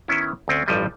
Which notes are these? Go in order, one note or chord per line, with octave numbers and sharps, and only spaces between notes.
D#3 B3 C#4 E4
D2 C4 C#4
A1 G2 F3 G3 D#5 G#5